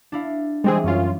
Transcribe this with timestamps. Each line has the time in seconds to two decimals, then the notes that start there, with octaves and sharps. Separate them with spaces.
0.12 D4 E4 F5
0.64 E3 G3 G#3 C4 G#4
0.84 F#2 C#4 F4